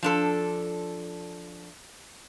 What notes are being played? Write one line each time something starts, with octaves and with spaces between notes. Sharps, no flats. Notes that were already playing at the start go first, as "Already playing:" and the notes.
F3 D4 A4